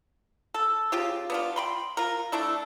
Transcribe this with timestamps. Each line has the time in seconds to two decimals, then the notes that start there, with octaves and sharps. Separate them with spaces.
0.54 A4
0.92 C#3 F4 G4
1.30 B3 D4 F4
1.56 G5 B5 C6
1.97 F4 A#4
2.32 A3 D4 E4